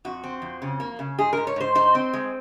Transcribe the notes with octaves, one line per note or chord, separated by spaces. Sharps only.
F2 F#4
C4
F2
C#3
A#3
C#3
G#2 G#4
G#2 A#4
C#5
G#2 C5
D#4 C5
C4
G#3